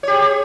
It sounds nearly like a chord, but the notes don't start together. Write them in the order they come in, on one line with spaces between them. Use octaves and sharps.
C#5 G4 G#4